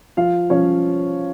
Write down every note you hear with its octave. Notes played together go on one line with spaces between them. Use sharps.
F3 F4 F5
F3 C#4 C#5